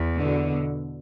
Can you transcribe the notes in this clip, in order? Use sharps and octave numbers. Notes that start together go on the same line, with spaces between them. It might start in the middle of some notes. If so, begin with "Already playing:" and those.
Already playing: E2
B2 D3